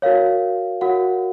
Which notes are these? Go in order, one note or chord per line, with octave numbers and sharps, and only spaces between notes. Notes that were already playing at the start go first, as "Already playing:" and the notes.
F#4 A#4 C#5 F5
F#4 A#4 C#5 F#5